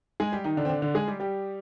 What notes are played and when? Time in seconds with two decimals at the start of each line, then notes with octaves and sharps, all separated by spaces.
0.20 G#3 G#4
0.32 G3 G4
0.44 D#3 D#4
0.57 D3 D4
0.65 C4
0.69 D3 D4
0.82 D3 D4
0.95 G#3 G#4
1.08 G3 G4
1.20 G3 G4